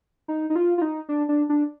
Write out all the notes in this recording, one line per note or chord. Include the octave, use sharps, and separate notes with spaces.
D#4
D#4
F4
F4
D#4
D4
D4
D4